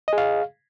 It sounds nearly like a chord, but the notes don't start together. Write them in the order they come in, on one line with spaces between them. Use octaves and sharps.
D#5 G#4 F5